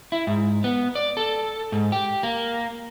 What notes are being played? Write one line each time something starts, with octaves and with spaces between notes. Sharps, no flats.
E4
G#2
B3
D5
A4
G#2
G4
A#3